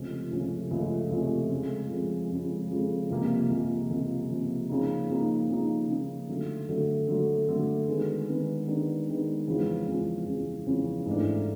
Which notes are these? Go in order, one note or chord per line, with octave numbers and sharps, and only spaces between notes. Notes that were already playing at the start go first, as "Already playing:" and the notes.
Already playing: C#2 C3 F3 A3 C#4
C#2 C3 F3 A3 C#4
C#2 C3 F3 A3 C#4
C#2 C3 F3 A3 C#4
F2 C#3 F3 G#3
F2 C#3 F3 G#3
F2 C#3 F3 G#3
F2 C#3 F3 G#3
C#2 C3 F3 A#3
C#2 C3 F3 A#3
C#2 C3 F3 A#3
C#2 C3 F3 A#3
C#3 F3 A#3 D#4
C#3 F3 A#3 D#4
C#3 F3 A#3 D#4
C#3 F3 A#3 D#4
D3 F#3 A3
D3 F#3 A3
D3 F#3 A3
D3 F#3 A3
D#3 G#3 B3 D4
D#3 G#3 B3 D4
D#3 G#3 B3 D4
D#3 G#3 B3 D4
E2 C#3 F3 G#3 C#4
E2 C#3 F3 G#3 C#4
E2 C#3 F3 G#3 C#4
E2 C#3 F3 G#3 C#4
G#2 E3 A3 D4